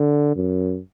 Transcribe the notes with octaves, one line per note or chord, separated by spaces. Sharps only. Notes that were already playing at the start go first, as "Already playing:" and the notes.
Already playing: D3
F#2